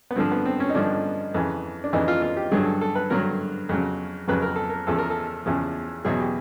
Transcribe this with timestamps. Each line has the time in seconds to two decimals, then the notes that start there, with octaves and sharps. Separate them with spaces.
0.11 B3
0.16 G2 D3 F3 C4
0.31 B3
0.45 C4
0.60 C#4
0.69 D#4
0.75 G2 D3 F3 D4
1.34 F2 C#3 E3
1.84 D4
1.93 F2 C#3 E3 D#4
2.08 F4
2.22 F4
2.37 G4
2.52 G2 D3 F#3 G#4
2.66 A4
2.81 A4
2.95 B4
3.10 G2 D3 F#3 A#4
3.69 F2 C#3 F#3
4.28 F2 C#3 F#3 B4
4.42 A#4
4.56 A4
4.70 A#4
4.87 E2 C#3 F3 A4
4.98 A#4
5.10 A4
5.46 E2 C#3 F3
6.05 E2 B2 F#3 G#4
6.20 G4